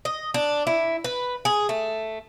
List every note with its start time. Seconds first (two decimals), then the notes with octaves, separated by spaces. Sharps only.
0.05 D#5
0.34 D4
0.67 E4
1.04 B4
1.45 G#4
1.69 A3